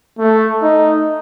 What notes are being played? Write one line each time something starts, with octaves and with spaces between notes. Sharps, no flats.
A3
D#4